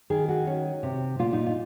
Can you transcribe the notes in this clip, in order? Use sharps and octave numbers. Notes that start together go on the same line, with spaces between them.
D#3 G#4
F#4
C#4
C3
A#2 F4
D#4
F4